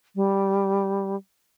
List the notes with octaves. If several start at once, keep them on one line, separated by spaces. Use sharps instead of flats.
G3